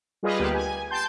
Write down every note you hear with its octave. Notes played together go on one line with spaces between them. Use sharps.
G3 F4 G#4 B4 D#5
D2 A#3 B3 G4 B4
G#5
G5 A5 C6 G6